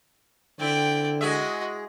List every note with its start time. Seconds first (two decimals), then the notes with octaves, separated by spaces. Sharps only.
0.60 D3 C4 E4 D5 G5
1.21 G#3 F#4 G#4 D#5 E5